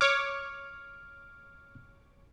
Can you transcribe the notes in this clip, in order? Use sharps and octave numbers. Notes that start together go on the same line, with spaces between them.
C#5 D6 F6